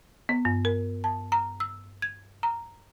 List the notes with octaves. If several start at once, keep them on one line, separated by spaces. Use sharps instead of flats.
B3
G2
A#4
A5
A#5
E6
G#6
A#5